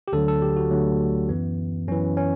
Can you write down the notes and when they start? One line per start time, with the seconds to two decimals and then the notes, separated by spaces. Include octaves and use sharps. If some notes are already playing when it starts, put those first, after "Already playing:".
0.08 G4
0.13 D2 D3 F#3 A4
0.28 A4
0.42 G4
0.57 F#4
0.71 D2 D3 F#3 A3
1.29 F#2 E3 B3
1.88 F#2 E3 C#4
2.17 C#4